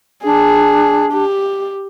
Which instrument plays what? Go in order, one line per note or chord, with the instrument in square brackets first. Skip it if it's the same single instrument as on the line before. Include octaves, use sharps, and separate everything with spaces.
[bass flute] D4 [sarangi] G#4
[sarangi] G4